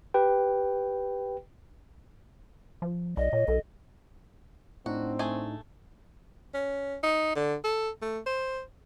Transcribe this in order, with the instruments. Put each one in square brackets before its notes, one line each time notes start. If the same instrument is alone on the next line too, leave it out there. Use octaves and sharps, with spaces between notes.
[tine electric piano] G4 B4 G5
[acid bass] F3
[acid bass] B1 [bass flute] D5 [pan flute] D#5
[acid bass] A#2 [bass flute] C#5
[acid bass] B1 [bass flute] A4
[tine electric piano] A2 D4 D#4 [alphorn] C4 [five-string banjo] F#4
[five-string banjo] A3 G#4 G#5
[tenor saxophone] C#4
D#4
D3
A4
A3
C5